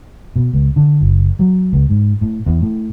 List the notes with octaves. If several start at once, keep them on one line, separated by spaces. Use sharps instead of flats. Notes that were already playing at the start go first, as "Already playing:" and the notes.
B2
C#2
D3
F#1
F#3
C#2
G#2
A2
E2
A2